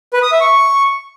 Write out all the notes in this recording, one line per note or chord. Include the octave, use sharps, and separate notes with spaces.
B4
D#6
E5
C#6